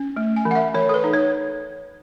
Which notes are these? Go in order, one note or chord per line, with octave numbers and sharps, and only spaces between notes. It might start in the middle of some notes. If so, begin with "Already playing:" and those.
Already playing: C#4
A3
G#5
E3
F#5
E5
E3 C#5
A4
B4
D#4
C#5